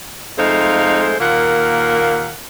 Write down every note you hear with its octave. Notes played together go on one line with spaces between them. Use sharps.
F2 G#3 A3 D#4 C5 F5
D#2 A#2 A#3 A#4 F5 F#5